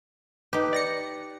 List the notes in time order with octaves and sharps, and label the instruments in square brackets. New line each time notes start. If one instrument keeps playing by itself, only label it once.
[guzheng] D#4 G4 [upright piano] B4
[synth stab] D5 A#6 C#7